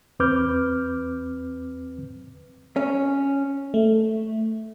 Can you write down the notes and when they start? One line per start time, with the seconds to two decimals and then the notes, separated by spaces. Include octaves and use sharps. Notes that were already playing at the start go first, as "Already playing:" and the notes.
0.20 E2 C4 B4 D6 F6 G6
2.76 C#4
3.74 A3